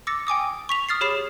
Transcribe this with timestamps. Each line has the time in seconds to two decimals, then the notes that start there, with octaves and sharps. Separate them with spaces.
0.07 D6 E6 A6 A#6 C#7
0.27 G5 G#5 D6 D#6
0.69 C#6 B6 F7
0.89 D#6 F6 A6 C7
1.01 G4 G#4 C#5 B5 C7 E7